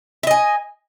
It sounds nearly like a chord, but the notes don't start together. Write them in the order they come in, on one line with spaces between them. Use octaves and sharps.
E5 D#5 G#5